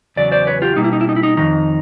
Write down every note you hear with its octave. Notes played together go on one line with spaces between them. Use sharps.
E2 C#3 F#3 D5
C5 D5
B4 C#5
F4 G4
B2 G3 A#3 D#4
E4
D#4
E4
D#4
E4
D#4
F2 C3 D#3 D#4